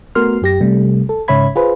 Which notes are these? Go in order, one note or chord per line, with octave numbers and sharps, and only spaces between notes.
A3 B3 F#4 A#4 C6 F6
F#2 G4 A#6
C3 G3 A3
A4
G#2 C#3 C#5 E5 B5 G#6
F4 G#4 B4 C5